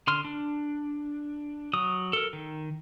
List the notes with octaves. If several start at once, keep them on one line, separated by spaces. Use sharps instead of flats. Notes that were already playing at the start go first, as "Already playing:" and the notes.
D3 C6 F6
D4
F#3 D#6
A4 A#4
D#3